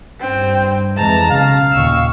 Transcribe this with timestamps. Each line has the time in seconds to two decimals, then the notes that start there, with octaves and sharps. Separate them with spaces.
0.21 G2 C4 G5
0.97 F2 E3 G#3 A5 A#5
1.31 B1 C#3 F5
1.72 D#2 A#2 D#3 C#6 E6